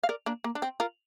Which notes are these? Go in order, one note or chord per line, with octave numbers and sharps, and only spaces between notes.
F5
A#4 D5
A#3 D4
A#3
D4
C4
F4 A#4